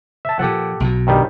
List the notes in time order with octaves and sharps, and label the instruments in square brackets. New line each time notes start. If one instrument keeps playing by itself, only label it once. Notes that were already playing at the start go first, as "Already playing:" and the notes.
[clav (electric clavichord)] E5 A5
[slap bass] A#2 F3 [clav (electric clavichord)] G4 A4 F#5
[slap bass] B1 B2
[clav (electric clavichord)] G2 D#3 G3